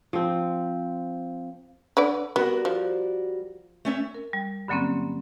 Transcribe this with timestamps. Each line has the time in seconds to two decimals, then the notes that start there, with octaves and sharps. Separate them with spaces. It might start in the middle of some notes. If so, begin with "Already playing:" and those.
0.13 F3 C4
1.97 D3 B4 D5
2.36 G3 B3 F#4 A#4
2.65 F3
3.85 A3 C#4 E5
4.14 A#4
4.33 G3
4.68 G2 D3 F#3 A#3 C4 C#4